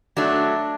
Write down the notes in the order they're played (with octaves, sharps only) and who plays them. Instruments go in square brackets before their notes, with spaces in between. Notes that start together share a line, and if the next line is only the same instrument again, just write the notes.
[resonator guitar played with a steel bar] F#3 A3 D4